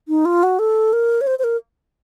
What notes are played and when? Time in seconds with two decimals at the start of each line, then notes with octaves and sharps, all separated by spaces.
0.08 D#4
0.25 F4
0.43 F#4
0.59 A4
0.93 A#4
1.21 C#5
1.27 C5
1.39 C5
1.44 A#4